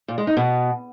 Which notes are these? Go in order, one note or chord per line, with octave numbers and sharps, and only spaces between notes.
A#2
G#3
D#4
B2